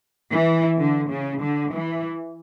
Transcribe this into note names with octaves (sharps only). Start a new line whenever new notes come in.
E3
D3
C#3
D3
E3